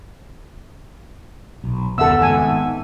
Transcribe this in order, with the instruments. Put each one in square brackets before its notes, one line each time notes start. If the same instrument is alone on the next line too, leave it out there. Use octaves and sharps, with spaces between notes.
[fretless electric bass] B1
[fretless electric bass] F#1 D#2 C#3 [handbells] B3 E5 F#5 [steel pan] A4 E6
[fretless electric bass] G#1 G#2 [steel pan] G#5